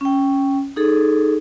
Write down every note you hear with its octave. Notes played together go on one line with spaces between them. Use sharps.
C#4 G5
D#4 G#4 A4